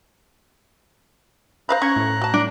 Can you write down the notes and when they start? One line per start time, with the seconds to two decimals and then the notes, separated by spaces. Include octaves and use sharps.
1.69 C5 F5 A#5 B5 F#6
1.82 C#4 C#6 G#6
1.96 A2
2.22 F#4 A5
2.34 D4